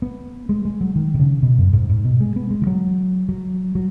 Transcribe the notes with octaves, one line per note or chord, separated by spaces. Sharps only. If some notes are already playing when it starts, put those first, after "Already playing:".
B3
G#3
G#3
F#3
D#3
B2
C#3
B2
F#2
G#2
G#2
B2
G#3
B3
G#3
D#3
F#3
F#3
F#3